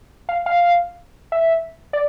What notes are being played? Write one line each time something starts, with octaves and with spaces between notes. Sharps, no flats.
F5
F5
E5
D5